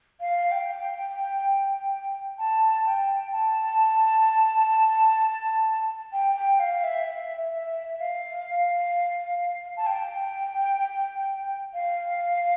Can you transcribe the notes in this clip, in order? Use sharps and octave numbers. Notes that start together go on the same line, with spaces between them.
F5
G5
A5
G5
A5
G5
G5
F5
E5
E5
E5
F5
A5
G5
F5